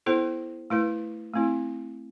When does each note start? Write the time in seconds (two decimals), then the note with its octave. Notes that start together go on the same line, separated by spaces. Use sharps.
0.06 B3 E4 A4 C5
0.70 A3 E4 B4
1.34 A3 C4 E4